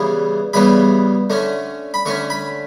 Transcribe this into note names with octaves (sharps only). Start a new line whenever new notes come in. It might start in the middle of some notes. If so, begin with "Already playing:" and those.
Already playing: C#3 E3 G3 B3
C#3 E3 G3 B3 B5
D3 A3 C#4
B5
D3 A3 C#4 C#6
B5